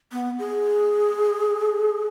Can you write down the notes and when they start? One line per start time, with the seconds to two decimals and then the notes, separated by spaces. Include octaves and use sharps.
0.12 B3
0.39 G#4